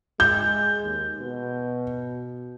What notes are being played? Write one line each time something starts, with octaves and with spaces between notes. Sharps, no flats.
G#3 G6
D#2
B2